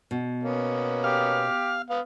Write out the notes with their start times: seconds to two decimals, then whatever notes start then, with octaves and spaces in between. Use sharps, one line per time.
0.11 B2
0.43 A#3 B3 C#4
1.04 G4 F5
1.90 B3 F5